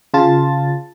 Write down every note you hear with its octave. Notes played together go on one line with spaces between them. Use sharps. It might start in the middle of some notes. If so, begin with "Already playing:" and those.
C#3 F4 A5 A6